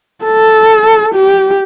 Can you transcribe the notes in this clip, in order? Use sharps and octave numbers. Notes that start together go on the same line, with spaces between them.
A4
G4